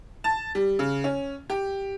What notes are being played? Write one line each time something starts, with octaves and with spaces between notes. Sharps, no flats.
A5
G3
C#3
C#4
G4